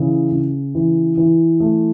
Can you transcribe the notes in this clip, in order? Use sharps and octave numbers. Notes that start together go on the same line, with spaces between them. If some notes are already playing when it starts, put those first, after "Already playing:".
Already playing: C#3 E3
C#3
E3
E3
A3